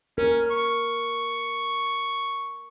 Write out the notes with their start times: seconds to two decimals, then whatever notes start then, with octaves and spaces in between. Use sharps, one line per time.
0.18 C#4 A#4
0.51 C#6